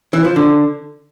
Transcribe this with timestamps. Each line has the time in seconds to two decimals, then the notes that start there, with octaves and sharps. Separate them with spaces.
0.13 E3
0.25 F3
0.36 D3